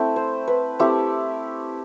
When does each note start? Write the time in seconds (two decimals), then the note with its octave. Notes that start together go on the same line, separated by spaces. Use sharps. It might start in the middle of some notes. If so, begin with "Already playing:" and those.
Already playing: A3 C4 E4 G5
0.16 C5
0.47 B4
0.79 A3 C4 E4 G4